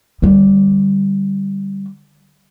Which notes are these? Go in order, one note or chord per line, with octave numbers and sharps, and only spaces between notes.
D3 G3